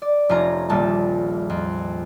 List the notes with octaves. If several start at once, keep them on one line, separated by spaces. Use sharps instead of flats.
D5
F1 C#4 F4 A#5
D#1 A#1 G3 A5
F2